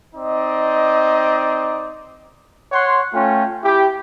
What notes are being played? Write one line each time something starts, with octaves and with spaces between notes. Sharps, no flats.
C4 D#4 D5 D#5
C#5 F#5 C6
A3 C#4 F4 G5
E4 G4